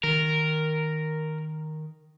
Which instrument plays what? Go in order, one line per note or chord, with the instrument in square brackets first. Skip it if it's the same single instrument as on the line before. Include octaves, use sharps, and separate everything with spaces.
[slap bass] D#3 [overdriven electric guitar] A#4